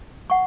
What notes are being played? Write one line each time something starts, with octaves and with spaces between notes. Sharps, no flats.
F#5 C#6